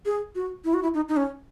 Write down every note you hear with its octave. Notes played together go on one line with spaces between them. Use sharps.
G#4
F#4
E4
F#4
E4
D#4
D#4
C#4